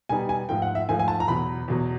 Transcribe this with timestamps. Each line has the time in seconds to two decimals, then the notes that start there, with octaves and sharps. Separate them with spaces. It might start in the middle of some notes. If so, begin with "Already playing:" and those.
0.09 B2 G3 B3 D#4 G#5
0.29 G#5
0.49 G#2 F3 A3 G5
0.62 F#5
0.75 E5
0.89 G#2 F3 A3 G#5
0.99 G#5
1.08 A5
1.20 A#5
1.28 E2 B2 F#3 B5
1.68 E2 B2 F#3